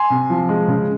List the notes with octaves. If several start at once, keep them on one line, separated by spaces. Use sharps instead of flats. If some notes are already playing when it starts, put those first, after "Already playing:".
Already playing: G#5 C6
C3
F3
G#3
C#3